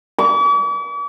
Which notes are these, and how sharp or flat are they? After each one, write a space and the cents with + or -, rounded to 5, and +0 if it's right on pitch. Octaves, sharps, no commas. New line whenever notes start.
D6 -45